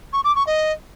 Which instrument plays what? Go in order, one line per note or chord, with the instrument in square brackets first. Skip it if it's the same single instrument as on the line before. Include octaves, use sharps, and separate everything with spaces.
[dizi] C#6
D6
C#6
D#5